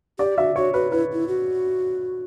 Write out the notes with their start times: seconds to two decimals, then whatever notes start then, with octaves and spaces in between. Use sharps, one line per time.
0.19 G4 D5
0.37 F#4 E5
0.56 F#4 C#5
0.74 F#4 B4
0.91 E4 B4
1.13 E4
1.28 F#4